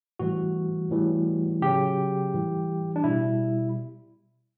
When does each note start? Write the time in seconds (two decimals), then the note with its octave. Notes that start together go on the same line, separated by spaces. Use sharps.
0.19 A2 E3 G3 F#4
0.91 A2 E3 G3
1.62 C#3 F#3 G4
2.33 A2 E3 G3
2.96 D4
3.04 B2 G3 E4